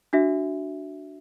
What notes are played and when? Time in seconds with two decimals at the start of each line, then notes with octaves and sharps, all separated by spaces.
0.13 D4 F#4 E5